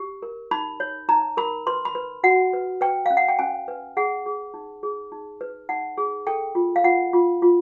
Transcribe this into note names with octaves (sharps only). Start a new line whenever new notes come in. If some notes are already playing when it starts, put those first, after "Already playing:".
Already playing: G4
A#4
D#4 B5
C#5
D#4 A#5
A#4 B5
B4 C6
B5
B4
F#4 F#5
B4
B4 G5
C#4 F5
F#5
G5
C#4 G#5
B4
G#4 F#5
G#4
D#4
G#4
D#4
B4
D#4 F#5
G#4
A4 G5
F4
F5
F4 F#5
F4
F4